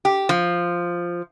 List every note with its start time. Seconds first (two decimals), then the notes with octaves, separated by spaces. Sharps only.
0.05 G4
0.29 F3